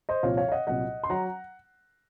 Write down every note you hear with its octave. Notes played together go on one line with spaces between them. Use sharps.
C5 D#5
C2 A#2 F3 C#5 F5
C#5 F5
F5
D#5 F#5
C2 A#2 F#3 D#5 F#5
C6
F#3 F#5 A#5